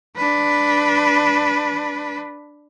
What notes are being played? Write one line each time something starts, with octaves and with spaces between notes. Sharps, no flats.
D4 B4